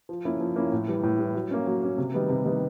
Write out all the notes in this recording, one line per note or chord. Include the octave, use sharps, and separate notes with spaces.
F3
A#3 C#4 E4
F3
A#3 C#4 E4
A2
E3 G3
A2
E3 G3
F#3
A#3 C#4
F#3
A#3 C#4
C3
D#3 G3 B3
C3
D#3 G3 B3